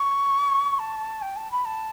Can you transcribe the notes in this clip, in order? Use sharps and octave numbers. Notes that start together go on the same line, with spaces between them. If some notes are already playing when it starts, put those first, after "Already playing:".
Already playing: C#6
A5
G5
A5
B5
A5